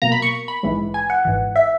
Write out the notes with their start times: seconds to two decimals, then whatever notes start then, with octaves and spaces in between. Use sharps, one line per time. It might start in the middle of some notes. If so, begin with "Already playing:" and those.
0.02 B1 B2 A#3 A#5
0.12 B5
0.22 C#6
0.48 B5
0.63 A#1 G#2 E3 G#3
0.94 G#5
1.10 F#5
1.25 G#1 G#2 E3
1.56 E5